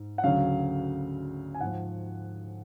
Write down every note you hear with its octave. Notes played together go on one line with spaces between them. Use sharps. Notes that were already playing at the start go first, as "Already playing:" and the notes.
Already playing: G#2
F#5
D2 C#3 F#3 F5
G#5
G#2 F3 F#5